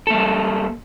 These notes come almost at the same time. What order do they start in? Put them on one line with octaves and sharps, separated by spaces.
A4 A#3 G3